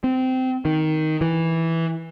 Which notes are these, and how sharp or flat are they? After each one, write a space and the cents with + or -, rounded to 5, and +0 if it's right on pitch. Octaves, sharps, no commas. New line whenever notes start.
C4 -20
D#3 +5
E3 -5